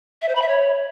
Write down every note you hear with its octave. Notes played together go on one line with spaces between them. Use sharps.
E5
C5
B5
E5
C#5